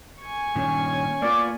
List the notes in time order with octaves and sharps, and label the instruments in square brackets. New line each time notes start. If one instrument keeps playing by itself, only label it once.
[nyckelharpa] G#5 C#6
[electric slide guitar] G2 A#2 D#3 [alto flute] C#4
[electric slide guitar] A#3 B3 F4 [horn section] D5